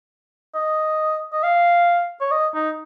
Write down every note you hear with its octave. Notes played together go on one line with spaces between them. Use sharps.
D#5
D#5
F5
C#5
D#5
D#4